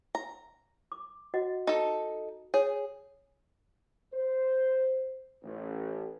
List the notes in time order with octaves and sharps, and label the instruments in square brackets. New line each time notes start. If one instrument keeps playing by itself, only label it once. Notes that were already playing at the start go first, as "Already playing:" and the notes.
[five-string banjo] A#5
[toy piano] D6
F#4 D#5 F#5
[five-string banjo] D#4 A4
[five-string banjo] G#4 [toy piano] C#5
[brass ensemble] C5
A1